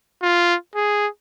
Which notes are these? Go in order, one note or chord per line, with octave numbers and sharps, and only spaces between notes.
F4
G#4